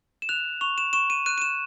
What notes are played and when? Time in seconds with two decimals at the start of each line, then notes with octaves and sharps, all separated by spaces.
0.22 E7
0.29 F#6 F7
0.61 C#6 F7
0.78 E7
0.93 C#6 E7
1.10 D#7
1.26 F#6 D#7
1.38 D#7
1.42 E7